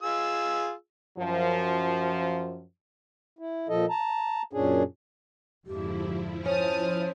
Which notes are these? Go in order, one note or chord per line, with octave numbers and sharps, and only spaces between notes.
F4 G#4 E6
F#2 F3
E4
A#2 F3 A4 D#5
A5 A#5
F#2 A#2 C#4 D4 G#4
F2 G#2 D3 F3 E4 G4
C#4 C5 A5 D#6 F6